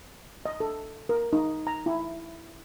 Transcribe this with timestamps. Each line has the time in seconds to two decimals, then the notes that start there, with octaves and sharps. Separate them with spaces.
0.46 D#5
0.60 A4
1.09 A#4
1.33 D#4
1.67 A#5
1.86 E4